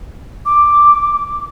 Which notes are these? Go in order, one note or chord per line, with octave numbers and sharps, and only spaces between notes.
D6